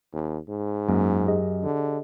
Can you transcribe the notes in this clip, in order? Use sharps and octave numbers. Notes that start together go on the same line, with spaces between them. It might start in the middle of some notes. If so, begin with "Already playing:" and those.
D#2
G#2
F#2 A#3
G4 G#4 D#5
D3